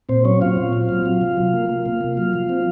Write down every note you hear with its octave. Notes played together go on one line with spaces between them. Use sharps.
A#2 C4 C5
F#3 C#4 C#5
C4 F4 F5
A#2
C4
F#3
F#3
C3
F#3
A#3
A#3
C3
A#3
F#3
F3
C4